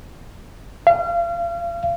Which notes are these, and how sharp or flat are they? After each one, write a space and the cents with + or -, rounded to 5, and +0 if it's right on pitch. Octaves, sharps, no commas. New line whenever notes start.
F5 -35